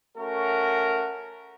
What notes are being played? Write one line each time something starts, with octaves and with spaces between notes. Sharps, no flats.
A3 C#4 F#4 A#4